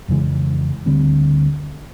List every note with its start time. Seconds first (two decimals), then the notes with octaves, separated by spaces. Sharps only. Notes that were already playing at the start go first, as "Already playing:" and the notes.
0.08 F2 C#3 E3 G#3
0.86 D2 D3 G3 C4